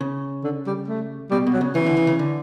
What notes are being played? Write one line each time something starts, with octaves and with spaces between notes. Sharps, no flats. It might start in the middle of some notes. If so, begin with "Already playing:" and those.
C#3
D3
G3
A3
B2 G3
B2
F#3
C#3
C#3 E3
D3
C#3
C#3
D3